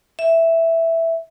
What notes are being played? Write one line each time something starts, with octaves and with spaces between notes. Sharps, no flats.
E5